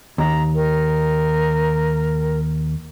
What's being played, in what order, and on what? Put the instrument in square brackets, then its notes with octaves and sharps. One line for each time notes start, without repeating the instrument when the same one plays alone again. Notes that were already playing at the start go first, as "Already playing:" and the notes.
[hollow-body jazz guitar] D#2 [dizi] A#5
[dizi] A#4